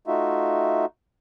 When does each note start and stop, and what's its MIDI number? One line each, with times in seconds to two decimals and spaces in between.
0.07 0.85 57
0.07 0.85 63
0.07 0.85 65
0.07 0.85 66
0.07 0.85 76